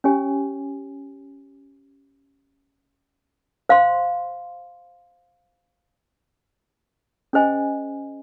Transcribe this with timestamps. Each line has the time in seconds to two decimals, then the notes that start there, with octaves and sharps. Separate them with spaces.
0.04 C#4 G4 C#5 G#5
3.69 C5 F5 C6
7.33 C#4 G#4 C5 D#5 G#5